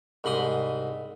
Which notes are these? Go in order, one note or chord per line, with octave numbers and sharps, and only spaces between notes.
C2 G#2 B5 C6 D#6